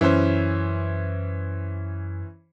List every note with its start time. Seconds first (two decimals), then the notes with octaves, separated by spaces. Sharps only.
0.01 F#2 E3 C#4 C5